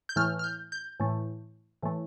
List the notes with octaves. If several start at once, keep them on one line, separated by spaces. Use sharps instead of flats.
G6
A2 E3 A3 F6
F6
G6
G6
A2 E3 A3
A2 E3 A3